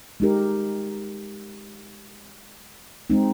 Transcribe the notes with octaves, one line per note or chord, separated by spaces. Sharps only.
G#3 D#4 G4 A#4
G#3 C4 D#4